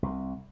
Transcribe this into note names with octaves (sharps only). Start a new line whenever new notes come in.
C2